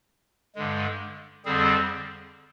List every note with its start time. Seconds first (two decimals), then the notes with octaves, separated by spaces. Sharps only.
0.55 G2 D3 G#3
1.45 F2 D3 G3 C4 G#4